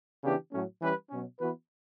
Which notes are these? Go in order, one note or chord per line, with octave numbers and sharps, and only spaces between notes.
C#3 E3 B3 D4 G4
A2 F#3 A3 C#4
E3 G3 C#4 G4 B4
B2 F#3 C#4
E3 B3 F#4 B4